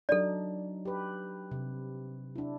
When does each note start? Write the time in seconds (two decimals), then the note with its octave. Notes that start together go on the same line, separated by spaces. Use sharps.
0.09 F#3 D4 D#4 A4 D5
0.85 G4 B4
1.51 C3
2.36 D4 E4